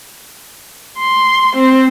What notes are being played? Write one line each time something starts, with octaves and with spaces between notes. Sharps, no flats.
C6
C4